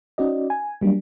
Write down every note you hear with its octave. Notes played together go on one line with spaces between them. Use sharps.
C#4 D#4 F#4 D5 D#5
G#5
F#3 G3 A#3 D4